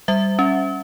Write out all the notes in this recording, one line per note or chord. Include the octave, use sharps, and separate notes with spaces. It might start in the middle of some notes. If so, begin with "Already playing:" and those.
G3 E5
C#4